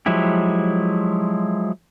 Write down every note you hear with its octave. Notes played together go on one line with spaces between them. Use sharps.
F3 F#3 G#3 E4 G4